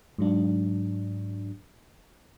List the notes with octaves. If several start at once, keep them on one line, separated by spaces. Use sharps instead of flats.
G#2 F#3 D4